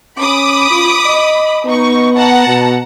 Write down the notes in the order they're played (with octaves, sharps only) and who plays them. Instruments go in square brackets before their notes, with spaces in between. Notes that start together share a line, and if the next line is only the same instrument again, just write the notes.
[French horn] C#4 [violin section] B5 D6 D#6
[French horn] F4
D#5
[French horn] B3 [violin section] D#4 C#6
[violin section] F#5 A5 A#5
[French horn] B2